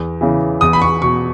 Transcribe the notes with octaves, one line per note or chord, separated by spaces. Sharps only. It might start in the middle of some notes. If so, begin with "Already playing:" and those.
Already playing: E2
C#3 E3
E2 D#6
B5
C#6
B2 C#6